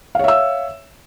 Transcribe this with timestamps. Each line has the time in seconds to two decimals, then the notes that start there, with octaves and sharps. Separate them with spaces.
0.15 F5
0.19 C#5
0.24 E5
0.28 E6